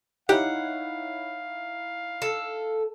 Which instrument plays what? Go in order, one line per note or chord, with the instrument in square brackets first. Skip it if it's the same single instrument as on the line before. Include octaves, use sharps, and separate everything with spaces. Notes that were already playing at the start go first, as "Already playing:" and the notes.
[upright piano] D#4 E4 C#5 [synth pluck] G4 [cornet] F5 [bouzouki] F#5
[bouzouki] A4